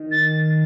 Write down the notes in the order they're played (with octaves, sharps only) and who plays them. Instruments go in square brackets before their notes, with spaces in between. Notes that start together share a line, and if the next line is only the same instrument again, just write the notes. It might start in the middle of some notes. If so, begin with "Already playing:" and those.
Already playing: [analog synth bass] D#3
[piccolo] A6